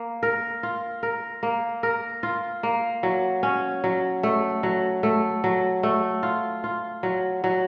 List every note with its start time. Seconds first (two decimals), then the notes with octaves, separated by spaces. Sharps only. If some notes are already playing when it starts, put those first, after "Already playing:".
Already playing: A#3
0.23 A#4
0.63 F4
1.03 A#4
1.43 A#3
1.83 A#4
2.23 F4
2.63 A#3
3.03 F#3
3.43 C#4
3.84 F#3
4.23 A3
4.63 F#3
5.03 A3
5.44 F#3
5.83 A3
6.23 F4
6.64 F4
7.03 F#3
7.44 F#3